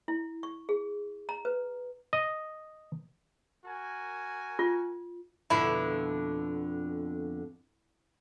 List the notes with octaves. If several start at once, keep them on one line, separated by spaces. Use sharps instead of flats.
E4
C#6
G#4
A#5
B4
D#5
F#4 A#4 G#5
F4
F2 B2 D3 E4